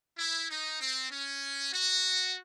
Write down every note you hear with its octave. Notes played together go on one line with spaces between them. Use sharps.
E4
D#4
C4
C#4
F#4